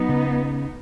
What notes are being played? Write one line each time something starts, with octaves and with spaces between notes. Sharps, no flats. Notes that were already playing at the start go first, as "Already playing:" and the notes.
Already playing: F#3 B3 D#4
C#3